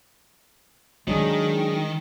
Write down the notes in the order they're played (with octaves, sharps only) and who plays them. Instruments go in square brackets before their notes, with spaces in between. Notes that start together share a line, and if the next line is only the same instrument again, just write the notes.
[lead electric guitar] D#3 [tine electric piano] F#3 D4 G#4 [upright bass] G#3